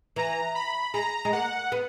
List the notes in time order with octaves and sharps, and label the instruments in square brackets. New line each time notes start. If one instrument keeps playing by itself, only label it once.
[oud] E3 [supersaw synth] A#5
[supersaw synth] B5
[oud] G#3 [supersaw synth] A#5
[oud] G#3
[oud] A#3 [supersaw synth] F#5
[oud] B3